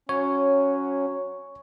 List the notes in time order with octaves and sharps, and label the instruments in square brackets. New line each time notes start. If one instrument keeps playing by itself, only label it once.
[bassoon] F#3 [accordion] C#4 [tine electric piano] C#5